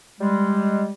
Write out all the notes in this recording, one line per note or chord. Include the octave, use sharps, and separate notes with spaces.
G3 G#3